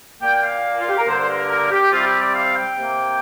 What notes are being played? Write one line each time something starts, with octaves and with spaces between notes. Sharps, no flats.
A#2 A#3 G5
F5
F4
G4
A#4
G2 D3 A#3 C5
C5
A#4
A#4
G4
C3 G3 C4 F4
G4
D5
F5
G5
C3 A#3